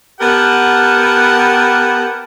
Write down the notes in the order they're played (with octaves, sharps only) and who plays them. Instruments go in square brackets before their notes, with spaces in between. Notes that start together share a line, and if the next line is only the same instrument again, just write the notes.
[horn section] B3 G4 A#4 F#5 A5